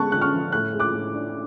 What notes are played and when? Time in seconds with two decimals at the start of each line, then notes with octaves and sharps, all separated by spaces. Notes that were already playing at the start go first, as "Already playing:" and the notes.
Already playing: D3 G#3 B3 A5 C#6 F#6
0.12 D3 F#6
0.21 C#6 F6
0.32 F3
0.52 A2 F#6
0.73 G#3
0.80 D6 F#6
0.94 A2
1.14 D4